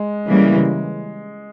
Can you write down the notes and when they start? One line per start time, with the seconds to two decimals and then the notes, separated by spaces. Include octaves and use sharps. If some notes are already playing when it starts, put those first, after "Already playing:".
Already playing: G#3
0.28 C#3 E3 G3 A#3